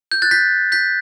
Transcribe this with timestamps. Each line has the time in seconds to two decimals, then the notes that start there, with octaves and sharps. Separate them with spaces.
0.12 G6
0.22 F#6 A6
0.31 G6 B6
0.72 G6 B6